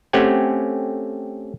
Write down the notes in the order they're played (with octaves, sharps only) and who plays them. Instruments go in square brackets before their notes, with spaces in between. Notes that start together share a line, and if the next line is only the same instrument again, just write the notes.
[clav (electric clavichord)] A3 C4 C#4 G4 F#5 G#5